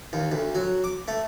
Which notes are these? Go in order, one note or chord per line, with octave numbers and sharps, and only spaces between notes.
D#2
D2
F#3
D6
A3